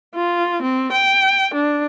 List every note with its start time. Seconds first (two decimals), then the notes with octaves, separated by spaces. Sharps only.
0.15 F4
0.62 C4
0.92 G5
1.54 D4